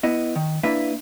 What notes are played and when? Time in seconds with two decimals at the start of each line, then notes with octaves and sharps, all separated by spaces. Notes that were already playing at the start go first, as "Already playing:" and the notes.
0.03 B3 E4 D#5
0.36 D#3
0.63 A#3 D4 E4 B4 E5